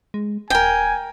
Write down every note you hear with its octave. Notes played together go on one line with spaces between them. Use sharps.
G#3
D#1 A#4 G5 G#5